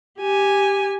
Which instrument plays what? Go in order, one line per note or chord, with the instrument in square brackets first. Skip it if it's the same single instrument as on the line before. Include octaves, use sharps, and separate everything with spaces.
[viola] G4 G#5